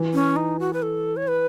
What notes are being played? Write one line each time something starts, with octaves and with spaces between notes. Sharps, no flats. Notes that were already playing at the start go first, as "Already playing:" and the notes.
Already playing: E3
C#4
D#4
F#4
B4
A4
C#5
B4